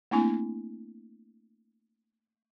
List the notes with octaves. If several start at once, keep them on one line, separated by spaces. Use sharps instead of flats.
A3 A#3 C4 D4 E4 G#5